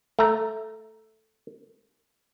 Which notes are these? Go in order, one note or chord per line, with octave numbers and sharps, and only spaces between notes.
A3 A#5